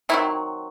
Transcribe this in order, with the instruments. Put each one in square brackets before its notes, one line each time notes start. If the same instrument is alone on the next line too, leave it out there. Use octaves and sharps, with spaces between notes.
[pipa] D#3 F#3 C4 E4